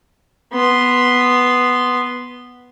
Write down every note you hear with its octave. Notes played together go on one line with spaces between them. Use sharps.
B3 C6